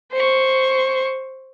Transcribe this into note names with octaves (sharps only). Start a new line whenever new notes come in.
C5 C#6